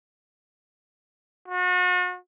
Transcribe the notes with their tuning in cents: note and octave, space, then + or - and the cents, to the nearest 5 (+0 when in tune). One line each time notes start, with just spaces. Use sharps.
F#4 -40